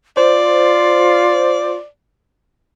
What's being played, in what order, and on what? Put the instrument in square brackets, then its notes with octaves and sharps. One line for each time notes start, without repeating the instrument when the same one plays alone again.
[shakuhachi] F4 [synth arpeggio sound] C5 [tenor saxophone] D5